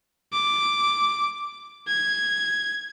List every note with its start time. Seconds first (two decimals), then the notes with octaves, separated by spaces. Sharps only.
0.33 D6
1.87 G#6